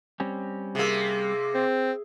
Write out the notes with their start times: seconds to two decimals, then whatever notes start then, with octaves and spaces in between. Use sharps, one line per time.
0.20 G3 C4 C#4
0.75 C3 A#3 G#4 E5
1.55 C4